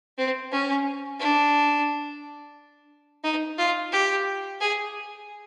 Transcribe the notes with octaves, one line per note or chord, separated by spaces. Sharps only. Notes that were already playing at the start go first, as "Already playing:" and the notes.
C4
C#4
D4
D#4
F4
G4
G#4